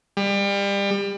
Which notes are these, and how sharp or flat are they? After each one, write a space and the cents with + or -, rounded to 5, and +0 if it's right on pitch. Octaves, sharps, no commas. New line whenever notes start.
G3 +30